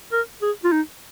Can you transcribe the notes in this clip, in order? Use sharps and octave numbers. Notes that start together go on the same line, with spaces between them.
A#4
G#4
F4
D#4